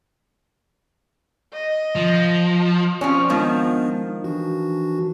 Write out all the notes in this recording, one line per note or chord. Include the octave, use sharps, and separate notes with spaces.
D#5
F3
F3 C4 C#4 D5
D#3 F3 G#3 B3 D4
E3 D4 F#4